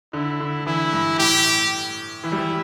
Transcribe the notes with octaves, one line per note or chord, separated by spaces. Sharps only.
D3 E4
D3
E3 E4
G2
A2 G4
E3 E4
G3
E3